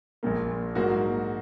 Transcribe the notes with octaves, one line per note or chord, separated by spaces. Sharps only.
A#1 A#2 A#3
G#2 F#3 A#3 F#4